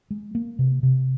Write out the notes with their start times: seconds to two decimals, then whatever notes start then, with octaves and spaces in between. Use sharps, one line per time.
0.10 G#3
0.35 A#3
0.59 C3
0.83 C3